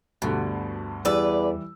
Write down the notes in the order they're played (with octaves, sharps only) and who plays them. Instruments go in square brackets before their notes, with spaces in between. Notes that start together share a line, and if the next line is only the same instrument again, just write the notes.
[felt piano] D2 G2 D3 [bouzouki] B2
[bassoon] E2 [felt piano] E3 G3 E6 [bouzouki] B4 D5